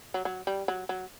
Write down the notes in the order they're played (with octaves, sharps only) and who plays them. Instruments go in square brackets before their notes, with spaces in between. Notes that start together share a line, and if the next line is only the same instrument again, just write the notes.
[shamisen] F#3
F#3
G3
F#3
F#3